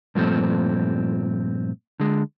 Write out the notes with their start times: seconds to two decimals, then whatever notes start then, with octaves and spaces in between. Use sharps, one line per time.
0.15 G2 A#2 F3 A3 B3 C4
2.00 D3 G#3